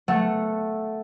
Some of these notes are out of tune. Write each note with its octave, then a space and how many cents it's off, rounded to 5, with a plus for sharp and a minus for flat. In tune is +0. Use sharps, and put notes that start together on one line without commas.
A3 -5 F#5 -5